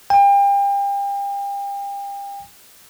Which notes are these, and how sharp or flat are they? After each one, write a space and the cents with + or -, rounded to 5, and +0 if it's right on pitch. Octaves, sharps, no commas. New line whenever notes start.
G5 +35